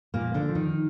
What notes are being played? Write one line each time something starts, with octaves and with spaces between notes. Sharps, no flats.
A#2 A#3
F3
D3 D4
F3
D#3 D#4